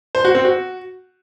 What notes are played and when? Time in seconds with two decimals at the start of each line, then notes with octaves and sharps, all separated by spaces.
0.15 C5
0.25 F#4
0.35 C4
0.45 F#4